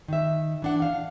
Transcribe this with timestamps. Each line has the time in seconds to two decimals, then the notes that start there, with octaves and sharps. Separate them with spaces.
0.08 D#3 E5
0.62 E3 D4 F#5
0.82 F5